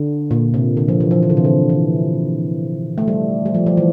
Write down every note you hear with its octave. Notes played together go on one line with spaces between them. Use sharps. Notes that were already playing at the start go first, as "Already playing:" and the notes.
Already playing: D3
A#2
C3
D3
F3
E3
F3
E3
D3
C3
D3
E3
A3
G3
G3
F3
F3
E3